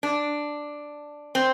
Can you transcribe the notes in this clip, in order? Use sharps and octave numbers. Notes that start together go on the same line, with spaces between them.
D4
C4